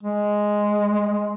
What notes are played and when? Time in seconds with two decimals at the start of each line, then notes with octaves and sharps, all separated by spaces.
0.03 G#3